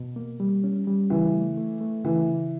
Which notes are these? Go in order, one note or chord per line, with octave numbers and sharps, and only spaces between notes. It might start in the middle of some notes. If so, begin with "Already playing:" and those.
Already playing: B2
A#3
G3
C#4
G3
C#3 E3
A3
A3
A3
C#3 E3
C#3